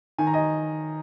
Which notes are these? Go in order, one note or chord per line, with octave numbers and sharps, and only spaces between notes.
D#3 G#5
A#5
D#5 G#5